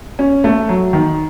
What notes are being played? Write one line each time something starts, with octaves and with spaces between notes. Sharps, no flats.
C#4
A3
F#3
D#3